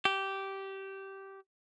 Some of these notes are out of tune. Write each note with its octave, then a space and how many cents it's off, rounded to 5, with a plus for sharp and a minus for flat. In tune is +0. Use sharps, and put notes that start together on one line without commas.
G4 -15